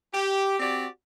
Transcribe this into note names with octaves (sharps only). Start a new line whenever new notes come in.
G4
C4 F#4 G4 D5